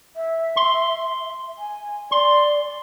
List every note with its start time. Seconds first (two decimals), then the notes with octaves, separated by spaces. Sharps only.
0.16 E5
0.56 C6
1.59 G#5
2.11 D5 C6